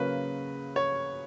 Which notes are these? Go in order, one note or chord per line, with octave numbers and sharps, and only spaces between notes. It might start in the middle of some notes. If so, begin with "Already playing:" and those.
Already playing: C#3 F#3 A#3 B4
C#5